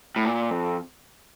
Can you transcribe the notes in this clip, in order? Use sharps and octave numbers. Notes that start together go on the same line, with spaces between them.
A2
A#2
F2